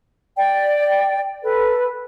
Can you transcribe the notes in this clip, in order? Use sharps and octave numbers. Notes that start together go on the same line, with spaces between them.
D5 G5
A4 B4